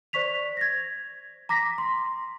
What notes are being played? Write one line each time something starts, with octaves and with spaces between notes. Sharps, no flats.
C5 D5 C#6 B6 F7
G#6 A#6
A#5 D6 A#6 B6
C6